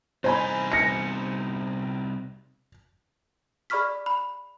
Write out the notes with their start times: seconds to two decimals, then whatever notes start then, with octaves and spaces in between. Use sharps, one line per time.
0.24 C2 D#4 C5 G#5 B5
0.72 A#6 C#7
3.70 G#4 D5 B5 C#6 F6 B6
4.06 B5